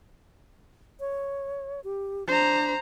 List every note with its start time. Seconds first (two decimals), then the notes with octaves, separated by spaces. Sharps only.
1.00 C#5
1.84 G4
2.27 D4 C5 A#5